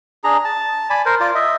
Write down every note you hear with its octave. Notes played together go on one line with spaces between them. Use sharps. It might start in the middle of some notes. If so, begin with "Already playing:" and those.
D4 G#4 A#5
A5
D5 G#5 B5
A#4 C5
F4 D5
D#5 E5